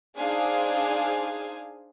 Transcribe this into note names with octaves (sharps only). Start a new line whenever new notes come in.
D4 D#4 G#4 C5 F5 G#5